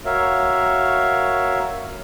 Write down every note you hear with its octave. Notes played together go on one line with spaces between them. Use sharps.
F#4 A#4 C#5 E5 F5